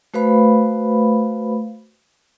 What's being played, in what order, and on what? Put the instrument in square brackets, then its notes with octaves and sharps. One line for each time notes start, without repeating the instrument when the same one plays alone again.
[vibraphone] A3 F#4 B4 C5 F5 B5